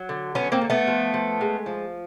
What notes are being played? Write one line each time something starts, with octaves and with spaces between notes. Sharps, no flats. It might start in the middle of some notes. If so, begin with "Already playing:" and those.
Already playing: F#3
D3
F#3 B3 C#4
A#3 C4
D3
A3 B3
F3
F3
G#3
F3